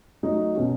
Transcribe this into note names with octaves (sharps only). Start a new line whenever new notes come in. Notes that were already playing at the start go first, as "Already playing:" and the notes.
F#3 A3 D#4
B2 F#3 C#4 F#4